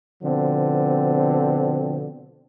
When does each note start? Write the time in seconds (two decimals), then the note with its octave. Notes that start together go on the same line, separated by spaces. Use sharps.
0.23 B2 D3 F3 C4